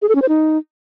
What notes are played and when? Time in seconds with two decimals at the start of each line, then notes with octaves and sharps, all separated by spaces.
0.02 G#4
0.09 A4
0.15 C#4
0.22 C5
0.29 D#4